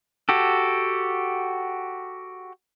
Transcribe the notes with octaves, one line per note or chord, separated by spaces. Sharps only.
F#4 G4 A4